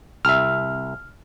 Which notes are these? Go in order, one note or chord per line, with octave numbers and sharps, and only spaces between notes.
C2 E5 F6